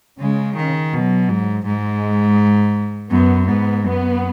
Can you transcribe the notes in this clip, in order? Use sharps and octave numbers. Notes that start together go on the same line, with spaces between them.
C#3 G#3
D#3
B2 F#3
G#2
G#2 G#3
F#2 B3
G#2 B3
F#2 B3